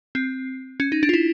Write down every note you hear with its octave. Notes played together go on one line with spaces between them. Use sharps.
C4
C#4
D#4
D4
F4
E4